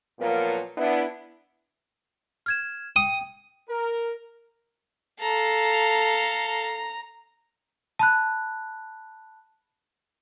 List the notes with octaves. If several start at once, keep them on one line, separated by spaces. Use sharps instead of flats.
A#2 F3 F#3 B3 F4 A#4
B3 D4 E4
F6 G#6 E7
G5 D#6
A#4
A4 F5 A#5
A5 B5 F#6